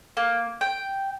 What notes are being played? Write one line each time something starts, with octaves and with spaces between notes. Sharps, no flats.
A#3
G5